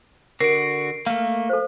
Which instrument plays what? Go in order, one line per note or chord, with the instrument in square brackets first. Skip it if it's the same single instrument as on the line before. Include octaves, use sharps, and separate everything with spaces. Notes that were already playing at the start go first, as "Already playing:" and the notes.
[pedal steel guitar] D3 F#4 [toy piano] A#4 [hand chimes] C7 D7
[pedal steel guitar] A3 A#3 [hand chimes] F5
[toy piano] A4 C5